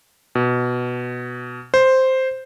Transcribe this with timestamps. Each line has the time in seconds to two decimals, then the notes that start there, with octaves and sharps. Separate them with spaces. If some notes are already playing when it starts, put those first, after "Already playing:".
0.35 B2
1.74 C5